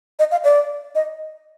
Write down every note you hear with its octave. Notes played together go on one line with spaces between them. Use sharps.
D#5
F5
D5
D#5